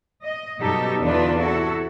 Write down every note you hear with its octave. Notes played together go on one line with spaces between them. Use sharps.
D#5
F#2 B2 G3 D#4 G4 A4
E2 D3 D4 D#4 F4 B4
C3 E4 F#4 A4